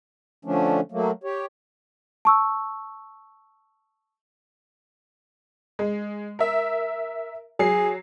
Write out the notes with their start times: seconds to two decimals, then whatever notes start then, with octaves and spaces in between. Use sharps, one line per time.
0.45 D3 F3 A3 C#4 D4
0.92 F#3 A3 A#3
1.24 G4 C#5
2.25 A5 C#6 E6
5.79 G#3
6.39 A#4 E5
7.59 F#3 G#4 C7